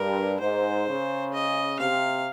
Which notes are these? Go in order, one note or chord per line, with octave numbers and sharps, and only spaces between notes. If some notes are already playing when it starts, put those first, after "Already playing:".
Already playing: G2 A#4
G#2 C5
C#3
D#5
C3 F5